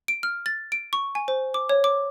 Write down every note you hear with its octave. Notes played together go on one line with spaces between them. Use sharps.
D7
F6
A6
D7
C#6
G#5
C5
D6
C#5
D6